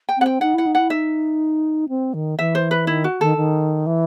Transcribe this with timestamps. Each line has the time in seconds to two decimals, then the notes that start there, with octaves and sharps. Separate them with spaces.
0.09 G5
0.18 C4 F#5
0.26 G5
0.41 D#4 F#5
0.54 E4 F#5
0.66 D#4
0.75 E4 F#5
0.90 D#4 E5
1.89 C4
2.14 D#3
2.39 E3 E5
2.55 C5
2.71 B4
2.87 D#3 E4
3.04 F#4
3.21 D#3 A4
3.37 D#3
3.86 E3